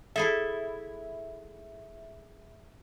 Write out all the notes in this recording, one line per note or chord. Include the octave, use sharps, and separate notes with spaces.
E4 G#4 A4 E5